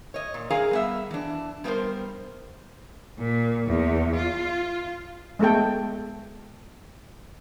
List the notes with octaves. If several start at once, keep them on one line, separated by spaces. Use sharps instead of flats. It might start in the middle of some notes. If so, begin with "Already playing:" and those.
C#5 D#5
A#2
G#4 A#4 D#5 F5 G#5 A#5
G3 B3 E5
E3 D4
G3 B3 D#4 F4 A#4 C5
A#2
E2
F4
G#3 A3 B3 A4 G5